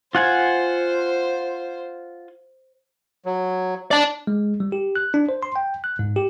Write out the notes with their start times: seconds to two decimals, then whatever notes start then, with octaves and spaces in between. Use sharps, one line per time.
0.15 F4 C5 F#5 G#5
3.26 F#3
3.91 D5 A5
4.27 G#3
4.60 G3
4.72 G4
4.96 F#6
5.14 D4
5.29 C5
5.43 C6
5.56 G5
5.84 F#6
5.99 G#2
6.16 G4